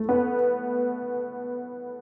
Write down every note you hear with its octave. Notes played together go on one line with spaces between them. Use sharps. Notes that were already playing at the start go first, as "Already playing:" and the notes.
Already playing: A3
B3